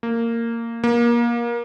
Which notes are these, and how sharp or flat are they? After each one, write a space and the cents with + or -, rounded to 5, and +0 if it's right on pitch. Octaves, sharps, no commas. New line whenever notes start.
A#3 -15
A#3 +25